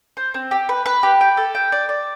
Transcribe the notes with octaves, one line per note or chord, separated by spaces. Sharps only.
C5
C4
G4
B4
B4
G4
G5
A4
G5
D5
D5